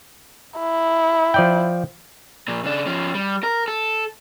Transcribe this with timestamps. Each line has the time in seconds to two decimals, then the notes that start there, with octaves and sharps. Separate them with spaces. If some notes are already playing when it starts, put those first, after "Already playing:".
0.59 E4
1.34 F3 D5 G5
2.48 A#2 F3
2.64 C#3 D4
2.86 F3 C#4
3.15 G3
3.43 A#4
3.68 A4